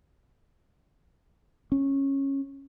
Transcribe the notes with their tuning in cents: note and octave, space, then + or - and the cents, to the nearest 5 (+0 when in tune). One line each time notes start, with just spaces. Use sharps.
C#4 -15